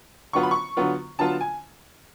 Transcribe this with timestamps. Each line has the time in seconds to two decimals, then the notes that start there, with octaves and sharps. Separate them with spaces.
0.33 D3 F#3 B3 F4 C#6
0.43 B5
0.51 C#6
0.77 D3 F#3 B3 F4
1.19 D3 F#3 B3 F4 A5
1.41 G#5